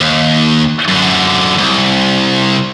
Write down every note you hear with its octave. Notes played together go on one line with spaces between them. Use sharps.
D#2
F#2 D3
C2